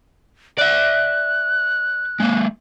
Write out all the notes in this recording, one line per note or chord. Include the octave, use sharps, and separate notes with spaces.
D5 E5 F#6
G#3 A#3